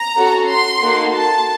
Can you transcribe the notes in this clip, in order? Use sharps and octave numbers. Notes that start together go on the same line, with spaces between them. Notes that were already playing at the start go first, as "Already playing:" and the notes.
Already playing: A#5
C#4 F#4 A4
C6
A#3 D#4 F#4 A4
A5